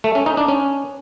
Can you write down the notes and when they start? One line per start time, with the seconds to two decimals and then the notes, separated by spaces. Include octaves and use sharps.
0.04 A3
0.15 C#4
0.26 D#4
0.37 D4
0.48 C#4